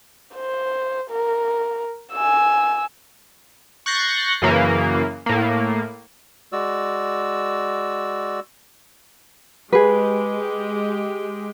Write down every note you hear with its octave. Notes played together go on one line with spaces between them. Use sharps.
C5
A#4
G#5 E6
C#6 F#6 G6 A6 A#6 C7
F#2 C#3 E3 A#3
A2 A#3
G#3 F#4 D5 E6
G#3 G4 G#4 B4